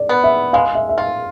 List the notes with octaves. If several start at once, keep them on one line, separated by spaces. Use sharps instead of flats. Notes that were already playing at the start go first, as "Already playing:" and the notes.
Already playing: D5
B3
E5
G#3 F5
E5
E5
F4 F5